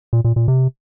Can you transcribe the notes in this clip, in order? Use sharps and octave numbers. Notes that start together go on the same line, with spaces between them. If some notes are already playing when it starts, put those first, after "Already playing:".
A#2
A#2
A#2
C3